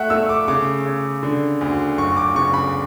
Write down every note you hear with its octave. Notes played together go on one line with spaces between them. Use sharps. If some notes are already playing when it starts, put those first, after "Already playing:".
Already playing: A3 E5 F#5
A3 E6
D6
C#3 D6
C#3
D3
D2
F#1 C#6
D6
C#3 C#6
B5